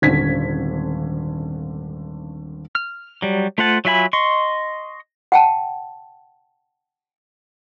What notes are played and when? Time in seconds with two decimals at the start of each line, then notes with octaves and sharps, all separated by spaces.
0.02 D#1 G#1 D3 C#4 G#6 B6
2.75 F6
3.22 F#3 G3
3.58 A3 F4 C5 F#5 A5
3.85 F#3 F4 E5 G#5 B5
4.13 D#5 C6 C#6
5.32 F#5 G5 A5